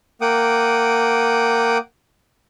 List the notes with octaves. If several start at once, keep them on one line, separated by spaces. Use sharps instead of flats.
A#3 F#5 G5 D6 D#6